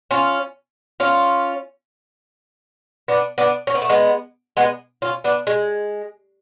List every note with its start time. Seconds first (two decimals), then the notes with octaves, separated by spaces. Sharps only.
0.11 C#4 F4
1.00 C#4 F4
3.08 B3 D4
3.38 B3 D4
3.67 C#4
3.75 B3
3.82 A3
3.89 G#3 B3
4.57 G#3 B3
5.02 C#4 F4
5.24 B3 D4
5.47 G#3